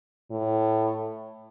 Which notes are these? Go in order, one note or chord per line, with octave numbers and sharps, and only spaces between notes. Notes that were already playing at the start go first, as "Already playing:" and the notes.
A2